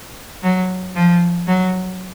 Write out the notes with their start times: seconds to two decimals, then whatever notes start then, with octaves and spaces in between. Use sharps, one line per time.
0.43 F#3
0.96 F3
1.47 F#3